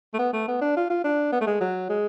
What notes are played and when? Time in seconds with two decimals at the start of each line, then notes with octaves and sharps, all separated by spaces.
0.14 A3
0.19 B3
0.33 A3
0.48 B3
0.61 D4
0.76 F4
0.90 F4
1.04 D4
1.32 B3
1.41 A3
1.47 G#3
1.61 F#3
1.89 G#3